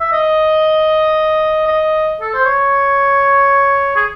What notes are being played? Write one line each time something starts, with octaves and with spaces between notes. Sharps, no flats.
E5
D#5
D#5
A4
C5
C#5
G#4